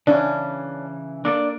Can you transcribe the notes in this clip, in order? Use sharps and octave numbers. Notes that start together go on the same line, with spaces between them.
C#3 E3 C#4 D4
A#3 D4 A4 D5